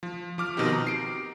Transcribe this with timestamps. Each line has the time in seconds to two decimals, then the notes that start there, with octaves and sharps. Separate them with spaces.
0.03 F3
0.38 F3 D6 F6
0.57 B2 D#3 C4 D#4 G4
0.73 A#5
0.87 C7 D7